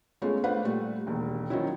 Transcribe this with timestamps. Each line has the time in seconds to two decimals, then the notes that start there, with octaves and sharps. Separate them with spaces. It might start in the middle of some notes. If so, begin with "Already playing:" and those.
0.22 G#3 A3 B3 C#4 F4
0.44 A3 D4 B4 C5 F5 F#5
0.63 A#2 G3 A3
1.07 E1 D#2
1.50 D#3 F3 F#3 C#4 E4